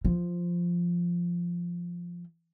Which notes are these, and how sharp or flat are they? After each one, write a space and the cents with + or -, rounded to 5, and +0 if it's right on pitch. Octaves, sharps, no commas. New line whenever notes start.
F3 -5